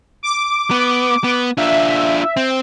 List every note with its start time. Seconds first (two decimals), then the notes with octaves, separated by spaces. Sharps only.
0.23 D6
0.71 B3
1.24 B3
1.57 D4 F4 E5
2.37 C4